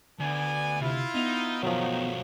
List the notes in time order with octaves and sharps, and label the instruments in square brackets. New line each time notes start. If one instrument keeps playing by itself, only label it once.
[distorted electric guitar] D2 [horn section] B3 D5 G#5
[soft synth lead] C3 [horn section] E4 F4
[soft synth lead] B3 [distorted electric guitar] D#4
[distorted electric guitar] B1 A3 [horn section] D#3 [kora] F3 F#3